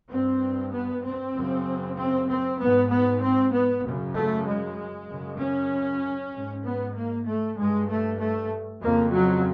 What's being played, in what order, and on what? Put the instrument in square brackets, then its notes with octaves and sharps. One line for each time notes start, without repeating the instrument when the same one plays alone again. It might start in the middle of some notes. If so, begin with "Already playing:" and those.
[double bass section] G2 C4
B3
C4
F#2 C#3
C4
C4
G#2 B3
B3
C4
B3
F#2 C#3
A3
G#3
F#2 C#3
C#4
G#2
B3
A#3
A3
G2 G#3
A3
A3
F2 C#3 A#3
F#3